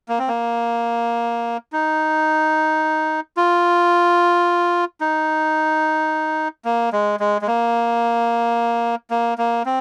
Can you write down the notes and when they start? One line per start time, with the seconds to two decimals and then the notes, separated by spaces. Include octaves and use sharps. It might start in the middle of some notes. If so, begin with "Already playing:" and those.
0.09 A#3
0.19 C4
0.28 A#3
1.73 D#4
3.37 F4
5.01 D#4
6.65 A#3
6.93 G#3
7.20 G#3
7.42 G#3
7.47 A#3
9.11 A#3
9.38 A#3
9.66 C4